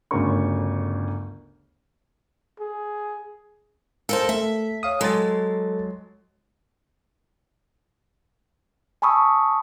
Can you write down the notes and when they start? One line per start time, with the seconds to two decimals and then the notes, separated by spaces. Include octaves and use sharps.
0.11 G1 D2 C#3 A#4 C#6
2.60 G#4
4.09 A4 A#4 C5 F5 A5
4.29 A3 E5
4.83 C#5 F5 D#6
5.01 F#3 G#3 A4 C6 A6
9.02 G#5 A5 B5 C#6 D#6 E6